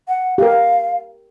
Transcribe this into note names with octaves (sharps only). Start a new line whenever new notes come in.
F#5
G4 A#4 F5